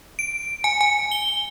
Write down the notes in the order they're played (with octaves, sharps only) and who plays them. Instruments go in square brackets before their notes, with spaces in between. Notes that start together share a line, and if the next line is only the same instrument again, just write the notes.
[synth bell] D7
G#5
G#5
G7